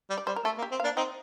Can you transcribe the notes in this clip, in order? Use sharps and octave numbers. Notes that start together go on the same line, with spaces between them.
G3
D5
G3 C5
A#4
A3 A4
A#3
G4
C4
F5
A#3 D4
C4 D#4 G5